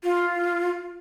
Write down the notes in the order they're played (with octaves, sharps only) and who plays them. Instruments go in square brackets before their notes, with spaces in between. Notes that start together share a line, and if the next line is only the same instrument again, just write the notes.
[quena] F4